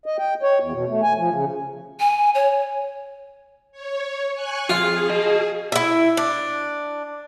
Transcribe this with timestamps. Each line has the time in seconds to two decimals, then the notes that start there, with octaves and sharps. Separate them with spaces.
0.06 D#5
0.18 G5
0.43 C#5
0.61 E2
0.72 B2
0.89 A3
1.03 G#5
1.18 F3
1.31 C#3
2.00 G#5
2.35 C#5
3.72 C#5
4.34 G#5 C#6 F#6
4.69 F2 F4 G#4
5.09 F#4 D#5
5.72 E4 E5
6.17 D4